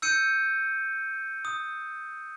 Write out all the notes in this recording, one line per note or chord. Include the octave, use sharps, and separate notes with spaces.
E6 G6 C#7 D#7
D#6